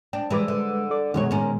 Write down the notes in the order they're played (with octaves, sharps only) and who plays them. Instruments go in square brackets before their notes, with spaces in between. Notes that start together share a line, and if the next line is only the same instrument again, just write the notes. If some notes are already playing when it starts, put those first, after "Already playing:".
[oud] D4 [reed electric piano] G5
[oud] E3 G3 [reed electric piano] G#3 B4 D6
[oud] D3
[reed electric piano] A4 D5 D6
[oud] F#2 B2 C#5 [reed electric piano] D#3 G#3 B3
[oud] A#2 C#4